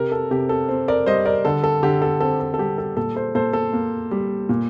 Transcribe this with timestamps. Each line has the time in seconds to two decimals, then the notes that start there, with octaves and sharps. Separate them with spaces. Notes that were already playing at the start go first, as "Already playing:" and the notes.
Already playing: C3 G4 A#4
0.12 A4
0.31 C3 G4
0.49 A4
0.69 C4
0.88 A#4 D5
1.06 G3 C5 D#5
1.25 A#4 D5
1.45 D3 A4
1.64 A4
1.83 D3 G4
2.02 A4
2.21 C4 A4
2.40 A4
2.54 A4
2.58 G3 G4
2.78 A4
2.96 A#2 A4
3.16 A4 C5
3.35 A#2 A4 C5
3.53 A4
3.73 A#3
4.11 G3
4.49 A#2